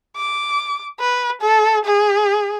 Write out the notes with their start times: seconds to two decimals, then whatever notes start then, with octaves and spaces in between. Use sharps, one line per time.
0.17 D6
1.00 B4
1.41 A4
1.85 G#4